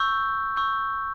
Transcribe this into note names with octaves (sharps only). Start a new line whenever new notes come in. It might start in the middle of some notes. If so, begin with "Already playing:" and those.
Already playing: C#6 E6 G6
C#6 E6 G6